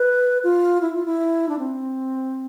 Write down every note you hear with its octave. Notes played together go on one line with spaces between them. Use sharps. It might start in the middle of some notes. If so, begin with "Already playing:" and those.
Already playing: B4
F4
E4
F4
E4
D4
C4